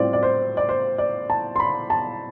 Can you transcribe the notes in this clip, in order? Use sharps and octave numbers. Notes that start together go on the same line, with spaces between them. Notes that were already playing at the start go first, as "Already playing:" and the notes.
Already playing: A2 G3 C4 F4 C5 D5
D5
C5
D5
C5
D5
A5
C6
B5
A5